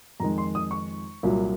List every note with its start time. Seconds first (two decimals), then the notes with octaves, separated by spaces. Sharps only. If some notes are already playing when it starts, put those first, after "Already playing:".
0.20 F2 D#3 G#3 A#5
0.38 C6
0.55 D#6
0.71 C#6
1.23 C2 A#2 F#3